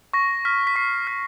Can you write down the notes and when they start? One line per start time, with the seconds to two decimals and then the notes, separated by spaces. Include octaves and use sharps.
0.13 C#6 A#6
0.45 F6 B6
0.67 B6
0.76 C#6 C7
1.07 F6 B6